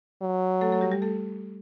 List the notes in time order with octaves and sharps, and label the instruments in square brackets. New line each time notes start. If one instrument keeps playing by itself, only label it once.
[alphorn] F#3
[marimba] A3 A4
A3 A4
G3 G4
G3 G4
A3 A4